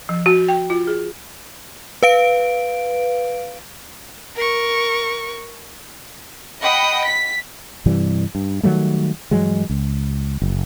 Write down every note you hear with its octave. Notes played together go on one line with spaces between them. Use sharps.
F3
F#4
G5
F4
G#4
B4 F5 D7
A#4 C#6
D#5 F#5 G5 B5 D#6
B6
G2 C3 E3 G3
G2
D#3 F#3 G3 A3
G2 E3 F#3 G#3
C#2
F#1